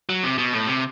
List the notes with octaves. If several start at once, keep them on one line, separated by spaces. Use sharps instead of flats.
F#3
C3
B2
A2
C3